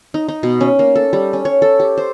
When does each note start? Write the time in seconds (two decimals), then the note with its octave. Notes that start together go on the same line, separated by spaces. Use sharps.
0.14 D#4
0.28 D#4
0.43 B2
0.61 C#4
0.79 A#3
0.96 A4
1.13 G3
1.33 C#4
1.45 C#5
1.62 A4
1.80 G4
1.98 C5